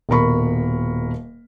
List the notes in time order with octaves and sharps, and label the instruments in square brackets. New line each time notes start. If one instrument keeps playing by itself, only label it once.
[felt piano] D#1 B2 A#4 B5 C#6